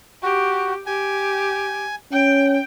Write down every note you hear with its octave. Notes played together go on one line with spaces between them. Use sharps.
F#4 G4
G4 G#5
C#4 G5